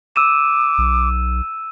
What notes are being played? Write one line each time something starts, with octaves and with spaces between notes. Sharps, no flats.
D6 E6 D#7 E7
B1